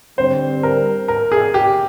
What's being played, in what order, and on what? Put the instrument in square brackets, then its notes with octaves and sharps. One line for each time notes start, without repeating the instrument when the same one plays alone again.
[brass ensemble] G2 D3 G3 C4 [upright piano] C5
[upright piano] A#4
A#4
G#4
G4